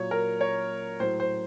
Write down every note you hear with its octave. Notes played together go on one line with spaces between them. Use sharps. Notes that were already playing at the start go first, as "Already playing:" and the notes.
Already playing: A#2 F#3 C#5
A#4
C#5
A2 F#3 C5
C5